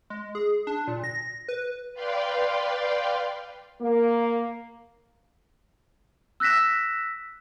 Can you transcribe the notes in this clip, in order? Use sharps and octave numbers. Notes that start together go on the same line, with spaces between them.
G#3
G#4
D4
A#2
A#6
B4
B4 D5 F5 G5 C6
A#3
E6 F#6 A#6 B6 E7